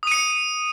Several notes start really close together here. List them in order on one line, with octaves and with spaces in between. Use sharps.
D#6 D#7 C#7